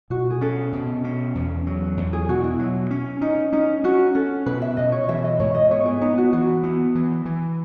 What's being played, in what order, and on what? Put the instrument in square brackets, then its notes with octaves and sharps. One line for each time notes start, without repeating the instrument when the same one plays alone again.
[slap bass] B2 [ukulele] F#4
[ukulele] G#4
[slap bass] C#4 [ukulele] A4
[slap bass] B2
C#4
E2
F#3
E2
[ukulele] G#4
[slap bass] B2 [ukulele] F#4
[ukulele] E4
[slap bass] F#3
C#4
[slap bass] C#4 [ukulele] D#4
[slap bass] C#4 [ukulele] D#4
[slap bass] C#4 [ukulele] F#4
[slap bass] C#4 [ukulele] A4
[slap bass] B2 [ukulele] B4
[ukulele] E5
[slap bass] B2 [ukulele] D#5
[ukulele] C#5
[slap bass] E3 [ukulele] E5
[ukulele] D#5
[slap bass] G#2 [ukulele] C#5
[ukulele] D#5
[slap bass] B3 [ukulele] C#5
[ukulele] G#4
[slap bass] B3 [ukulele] D#4
[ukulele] F#4
[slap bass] E3 [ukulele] F#4
[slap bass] B3
E3
E3